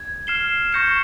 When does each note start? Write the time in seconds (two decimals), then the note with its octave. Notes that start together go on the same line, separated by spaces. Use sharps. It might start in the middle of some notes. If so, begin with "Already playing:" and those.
Already playing: G#6
0.27 F6 C7 E7 G7
0.73 C#6 G6 A#6 C#7 E7